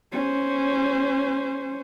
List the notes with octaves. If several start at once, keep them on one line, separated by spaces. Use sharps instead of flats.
C#4 C5